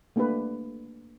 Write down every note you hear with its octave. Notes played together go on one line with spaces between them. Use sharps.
A3 A#3 D4 G4 B4